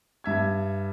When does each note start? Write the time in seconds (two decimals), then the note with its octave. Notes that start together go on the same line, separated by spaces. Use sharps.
0.24 G2 E5 G#6